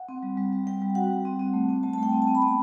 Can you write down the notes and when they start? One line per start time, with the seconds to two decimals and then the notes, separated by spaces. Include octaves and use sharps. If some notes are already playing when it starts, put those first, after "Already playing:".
Already playing: F#5
0.09 C4
0.23 G3
0.37 G3
0.53 G3
0.67 G3 G5
0.82 G3
0.95 F#4 F#5
1.10 G3
1.25 C4
1.39 C4
1.54 A3
1.69 C4
1.83 A3 A5
1.93 A5
1.98 A3 G5
2.12 C4
2.22 A5
2.27 C4
2.35 B5
2.42 B3 A5